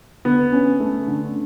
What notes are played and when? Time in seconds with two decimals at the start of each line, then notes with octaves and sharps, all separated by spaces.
0.25 D3 B3
0.53 C#4
0.80 A3
1.07 D3